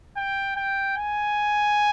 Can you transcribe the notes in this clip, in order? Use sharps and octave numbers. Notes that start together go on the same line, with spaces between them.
G5
G5
G#5